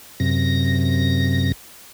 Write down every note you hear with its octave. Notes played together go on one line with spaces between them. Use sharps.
F#2 C3 A#6